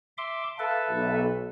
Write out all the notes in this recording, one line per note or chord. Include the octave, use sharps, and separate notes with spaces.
E5 C6 D6
A4 B4 E5 F5 A5
B1